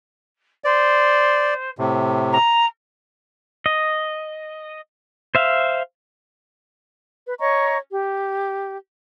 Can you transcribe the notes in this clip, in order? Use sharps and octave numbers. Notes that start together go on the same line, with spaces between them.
C5 D5
A2 C3
A#5
D#5
C5 E5 F5
B4
C#5 D#5 A#5 C#6
G4